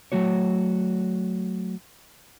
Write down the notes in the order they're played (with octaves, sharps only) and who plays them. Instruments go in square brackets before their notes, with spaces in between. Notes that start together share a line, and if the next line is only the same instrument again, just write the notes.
[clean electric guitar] F#3 A3 F#4 C#5